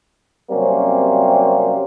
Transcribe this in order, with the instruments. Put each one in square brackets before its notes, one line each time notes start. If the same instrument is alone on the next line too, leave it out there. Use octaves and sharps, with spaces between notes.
[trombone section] C3 F#3 G3 A#3 C4 C#4